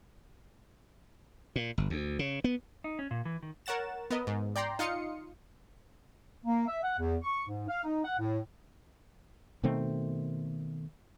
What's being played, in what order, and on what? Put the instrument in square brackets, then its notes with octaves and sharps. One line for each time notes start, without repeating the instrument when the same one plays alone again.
[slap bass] A#2
G1
D2
C#3
B3
[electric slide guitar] D#4
C#4
A#2
E3
D#3
[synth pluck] A#4 C#5 F#5 A6 E7
B3 A#4 D#5
G#2
D5 G5 A#5 C6
D#4 F4 F5 C6 D#6 C#7
[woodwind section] A#3
E5
F#5
E2
C#6
G#2
F5
D#4
F#5
A2
[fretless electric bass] B2 D#3 A3 C4